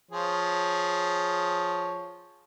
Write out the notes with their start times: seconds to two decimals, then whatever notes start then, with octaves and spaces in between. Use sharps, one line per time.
0.11 F3 G#4 C#5